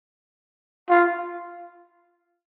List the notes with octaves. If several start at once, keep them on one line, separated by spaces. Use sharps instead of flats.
F4